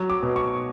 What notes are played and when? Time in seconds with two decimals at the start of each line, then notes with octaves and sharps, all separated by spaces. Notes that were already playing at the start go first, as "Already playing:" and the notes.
Already playing: F#3
0.10 D6
0.23 B2
0.36 C#6